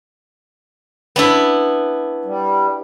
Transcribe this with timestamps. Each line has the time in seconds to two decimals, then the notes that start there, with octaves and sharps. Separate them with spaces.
1.16 B3 D4 E4
2.25 G3